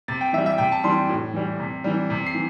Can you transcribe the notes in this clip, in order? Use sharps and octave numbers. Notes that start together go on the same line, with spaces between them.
C3 A6
G5
E3 G3 E5
E5
C3 G5
A5
E3 G3 C6
A2
E3 G3
C3
E3 G3
C3
C7
E3